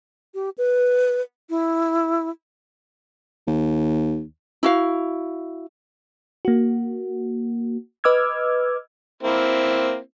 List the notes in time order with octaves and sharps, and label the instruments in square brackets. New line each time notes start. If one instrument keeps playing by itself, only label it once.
[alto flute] G4
B4
E4
[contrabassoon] D#2
[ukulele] E4 F#4 F5
[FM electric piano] A#3 F#4
B4 D#5 D6 E6 F6 G#6
[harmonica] A#3 C4 E4